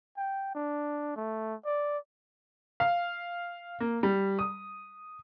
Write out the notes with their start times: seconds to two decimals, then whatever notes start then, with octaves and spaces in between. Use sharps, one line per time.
0.17 G5
0.55 D4
1.16 A3
1.65 D5
2.80 F5
3.80 A#3
4.03 G3
4.39 D#6